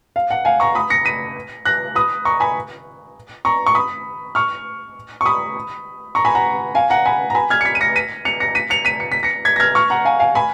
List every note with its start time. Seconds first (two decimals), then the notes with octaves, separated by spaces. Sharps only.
0.16 F5
0.30 F#5
0.45 F5 G#5
0.60 A#5 C#6
0.75 B5 D#6
0.90 A#6 C#7
1.05 B6 D#7
1.65 F#6 A#6
1.95 B5 D#6
2.25 A#5 C#6
2.40 G#5 B5
3.45 A#5 C#6
3.66 C#6
3.75 B5 D#6
4.35 C#6 F6
5.21 C#6
5.25 B5 D#6
6.15 A#5 C#6
6.25 G#5 B5
6.35 F#5 A#5
6.75 F5 G#5
6.90 F#5 A#5
7.05 G#5 B5
7.30 A#5
7.35 G#5 B5
7.50 F6 G#6
7.61 C#7
7.65 G#6 B6
7.75 D#7
7.81 A#6 C#7
7.96 B6 D#7
8.25 C#7 F7
8.40 A#6 C#7
8.55 B6 D#7
8.70 C#7 F7
8.85 B6 D#7
9.00 C#7
9.12 B6
9.23 A#6 C#7
9.45 G#6 B6
9.56 A#6
9.60 F6 G#6
9.75 C#6 F6
9.90 F#5 A#5
10.05 F5 G#5
10.20 F5 G#5
10.35 G#5 B5